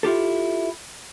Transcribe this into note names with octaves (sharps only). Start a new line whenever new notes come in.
E4 F4 G4 A4